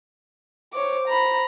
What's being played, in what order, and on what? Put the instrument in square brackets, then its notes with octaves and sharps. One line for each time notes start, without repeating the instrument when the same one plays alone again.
[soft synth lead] C5 [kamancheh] C#5 D6
[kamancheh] A#5 B5